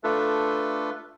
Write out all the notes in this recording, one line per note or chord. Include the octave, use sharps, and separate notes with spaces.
A3 D4 F4 A4 B4